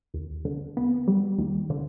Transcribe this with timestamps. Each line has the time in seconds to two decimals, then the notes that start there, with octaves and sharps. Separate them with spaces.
0.14 D#2
0.45 D3
0.77 B3
1.08 G3
1.38 D#2
1.70 D3